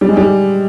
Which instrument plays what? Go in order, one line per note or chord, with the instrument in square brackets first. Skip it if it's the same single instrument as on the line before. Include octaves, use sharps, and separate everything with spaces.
[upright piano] G3
G#3
G3